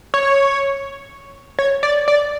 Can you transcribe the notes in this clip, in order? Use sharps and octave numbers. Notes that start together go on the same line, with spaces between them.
C#5
C#5
D5
D5